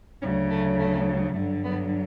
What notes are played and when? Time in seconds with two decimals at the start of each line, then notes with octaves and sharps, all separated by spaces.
0.22 D2 C#3 F#3 C#4
0.50 A3
0.78 A3
1.35 G2 D3 F#3 A3
1.63 B3